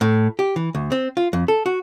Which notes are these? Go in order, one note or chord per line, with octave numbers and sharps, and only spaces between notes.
A2
G4
E3
D2
C4
F4
F2
A4
F#4